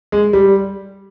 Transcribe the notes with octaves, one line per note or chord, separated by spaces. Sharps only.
G#3
G3